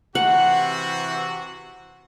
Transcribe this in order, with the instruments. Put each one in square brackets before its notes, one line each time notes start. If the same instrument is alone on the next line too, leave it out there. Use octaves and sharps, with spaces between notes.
[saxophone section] C3 E3 [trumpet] F#4 [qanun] F#5